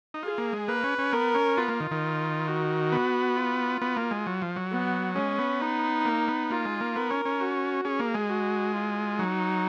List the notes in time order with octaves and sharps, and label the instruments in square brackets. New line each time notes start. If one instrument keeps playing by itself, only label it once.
[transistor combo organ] D#4
[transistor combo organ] F4 [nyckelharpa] G#4
[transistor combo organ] A#3
G#3
[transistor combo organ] A#3 [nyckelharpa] B4
[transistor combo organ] C#4
C#4
[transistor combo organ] B3 [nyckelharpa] A#4
[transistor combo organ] C#4
[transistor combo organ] B3 [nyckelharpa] F4
[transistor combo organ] A#3
D#3
D#3
[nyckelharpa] F#4
[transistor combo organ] B3
[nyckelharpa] F4
[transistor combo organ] B3
A#3
G#3
F#3
F3
F#3
[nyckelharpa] B3
[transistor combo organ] G#3 [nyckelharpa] C#4
[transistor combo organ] B3
[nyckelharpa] D#4
[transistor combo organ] A#3
B3
[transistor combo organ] A#3 [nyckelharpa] F4
[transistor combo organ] G#3
A#3
[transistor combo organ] B3 [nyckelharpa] A#4
[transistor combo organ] C#4
C#4
[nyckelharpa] F#4
[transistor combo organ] C#4 [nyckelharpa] G#4
[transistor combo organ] A#3
G#3
[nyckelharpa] F#4
F4
[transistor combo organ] F#3 [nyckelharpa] D#4